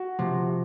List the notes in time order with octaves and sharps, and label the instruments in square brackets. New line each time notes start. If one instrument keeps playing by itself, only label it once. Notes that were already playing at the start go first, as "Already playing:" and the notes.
Already playing: [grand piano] F#4
[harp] C3 [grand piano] F3
[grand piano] F#4